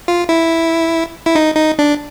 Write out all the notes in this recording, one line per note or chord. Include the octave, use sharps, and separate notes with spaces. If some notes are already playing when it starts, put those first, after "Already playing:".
F4
E4
E4
D#4
D#4
D4